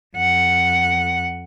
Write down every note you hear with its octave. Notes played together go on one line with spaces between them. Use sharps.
F2 F#5